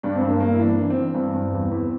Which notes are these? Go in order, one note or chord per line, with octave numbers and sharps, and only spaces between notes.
G2 D4
C4
G2
A#3
G2 A#3
E4
E3 D4
E3 D4
C4
E3
G2 C4
G2
E2
E2